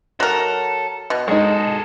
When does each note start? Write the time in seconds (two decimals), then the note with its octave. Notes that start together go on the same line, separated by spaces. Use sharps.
0.20 F#3 A4 A#4
1.10 B2
1.28 G#3 D#4 G#4 A4